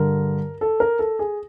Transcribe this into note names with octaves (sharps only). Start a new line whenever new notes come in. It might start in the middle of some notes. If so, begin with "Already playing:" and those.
Already playing: G2 D3 A#4
A4
A#4
A4
G#4